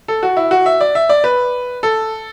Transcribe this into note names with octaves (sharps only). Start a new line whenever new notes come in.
A4
F#4
E4
F#4
E5
D5
E5
D5
B4
A4